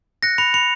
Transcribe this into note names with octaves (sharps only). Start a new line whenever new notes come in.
F#6 A#6 C#7
B5 C#7 F7
B5 C#7 F7